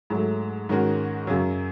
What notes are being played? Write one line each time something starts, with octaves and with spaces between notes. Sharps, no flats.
G#2 F#3 A3
G#2 D#3 G#3 C#4 F#4
F#2 C#3 F#3